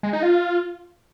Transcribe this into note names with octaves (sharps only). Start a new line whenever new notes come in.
G#3
D#4
F4